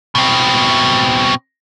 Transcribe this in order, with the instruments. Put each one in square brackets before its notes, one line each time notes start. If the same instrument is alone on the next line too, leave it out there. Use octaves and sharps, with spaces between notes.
[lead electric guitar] B2 C4